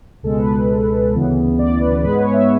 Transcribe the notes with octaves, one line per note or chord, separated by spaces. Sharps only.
C#2 B2 G#3 A4
B4
D2 C#3 E3 B3
D5
B4
G#2 G#3 B3 B4
C#5
E5